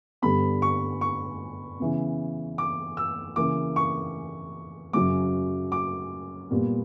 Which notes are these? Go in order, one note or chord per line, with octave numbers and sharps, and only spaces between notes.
G2 D3 G3 B3 B5
C#6
C#6
C#3 E3 B3
D6
E6
C#3 E3 A#3 D6
C#6
F#2 C#3 F#3 D6
D6
A#2 G3 B3